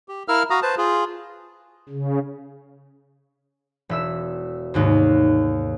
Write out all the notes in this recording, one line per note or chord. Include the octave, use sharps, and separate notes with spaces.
G4
E4 A#4 F5 E6 F6
F#4 F5 A#5 D#6
B4 C5 A5
F4 G#4
C#3
E1 E5 E6
D#2 G#2 C3